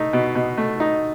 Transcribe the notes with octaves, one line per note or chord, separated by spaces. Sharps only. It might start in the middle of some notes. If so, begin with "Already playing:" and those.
Already playing: A3 D#4
B2
B2
A3
D#4